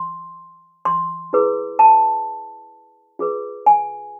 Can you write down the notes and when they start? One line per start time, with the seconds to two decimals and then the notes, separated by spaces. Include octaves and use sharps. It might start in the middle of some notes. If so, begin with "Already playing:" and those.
Already playing: C6
0.85 C6
1.33 E4 G#4 B4
1.79 A5
3.19 F4 G#4 B4
3.66 G#5